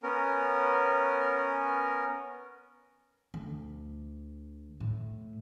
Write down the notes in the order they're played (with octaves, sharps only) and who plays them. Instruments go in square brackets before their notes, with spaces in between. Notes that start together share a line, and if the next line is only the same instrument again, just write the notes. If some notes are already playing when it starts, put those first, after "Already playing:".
[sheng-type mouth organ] B3 C#4 A#4
[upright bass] D2
A2